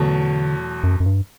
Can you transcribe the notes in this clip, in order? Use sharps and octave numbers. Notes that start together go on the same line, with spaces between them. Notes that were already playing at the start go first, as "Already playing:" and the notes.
Already playing: E2 B2 D3 F#3 A3
F#2
F#2
G2